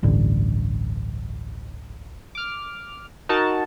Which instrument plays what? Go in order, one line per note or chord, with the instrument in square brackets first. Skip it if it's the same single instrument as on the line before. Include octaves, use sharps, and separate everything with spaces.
[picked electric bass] D1 A1 G2 D3
[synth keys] D6 F6
D#4 F#4 A#4 A5